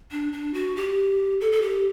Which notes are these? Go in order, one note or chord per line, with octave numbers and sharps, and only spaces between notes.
D4
D4
F#4
G4
A4
A4
G4